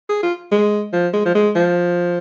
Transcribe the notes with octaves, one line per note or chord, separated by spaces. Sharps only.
G#4
F4
G#3
F3
G#3
F3
G#3
F3